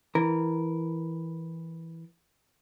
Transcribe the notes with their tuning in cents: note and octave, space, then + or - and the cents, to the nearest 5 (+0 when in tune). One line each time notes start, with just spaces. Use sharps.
E3 -5 A#4 +0